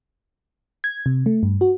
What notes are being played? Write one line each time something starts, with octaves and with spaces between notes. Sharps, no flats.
G#6
C3
A3
G2
F#4